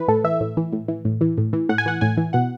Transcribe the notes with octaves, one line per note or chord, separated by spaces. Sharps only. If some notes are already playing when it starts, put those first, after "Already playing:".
Already playing: E3 B4
A2 A4
E3 E5
A2
E3
A2
E3
A2
E3
A2
E3
A2 F#5
G#5
E3 F#5
A2 G#5
E3
B2 F#5